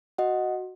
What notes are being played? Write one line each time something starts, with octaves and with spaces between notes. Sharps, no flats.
F#4 D#5 F#5